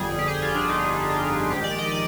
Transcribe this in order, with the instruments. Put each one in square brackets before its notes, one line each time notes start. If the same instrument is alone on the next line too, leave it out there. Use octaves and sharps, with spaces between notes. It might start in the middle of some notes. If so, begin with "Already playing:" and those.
Already playing: [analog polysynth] G1 F2 D3 G3 G#4
G4
G#4
F4
D4
D#4
F4
A#1 G#2 D#3 G#3 G4
D5
D#5
D5